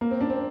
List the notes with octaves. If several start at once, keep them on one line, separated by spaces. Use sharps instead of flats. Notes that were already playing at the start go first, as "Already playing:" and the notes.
A#3
C4
D4
C4